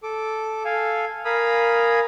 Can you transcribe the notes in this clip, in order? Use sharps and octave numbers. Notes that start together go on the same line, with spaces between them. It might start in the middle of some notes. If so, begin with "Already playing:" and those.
A4 D6
A4 F5 G#5
A#4 F5 G#5 B5 D#6